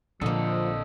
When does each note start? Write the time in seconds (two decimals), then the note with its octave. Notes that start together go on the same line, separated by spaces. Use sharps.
0.21 A#1 D3 F3 A#3 A4 D#5